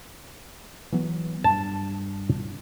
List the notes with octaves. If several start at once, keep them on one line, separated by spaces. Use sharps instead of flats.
E3 F#3 B3
G2 A5